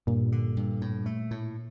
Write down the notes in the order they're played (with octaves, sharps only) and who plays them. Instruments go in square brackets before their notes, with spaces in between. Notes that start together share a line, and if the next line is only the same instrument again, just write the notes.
[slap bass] G2 [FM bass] A#2
[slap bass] D3
G2
A2
A3
A2